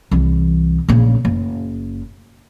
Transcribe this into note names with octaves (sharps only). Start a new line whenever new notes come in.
C2 E3
A#1 C#3
F#1